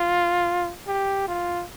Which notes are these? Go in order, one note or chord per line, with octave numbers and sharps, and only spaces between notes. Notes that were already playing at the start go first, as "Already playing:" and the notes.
Already playing: F4
G4
F4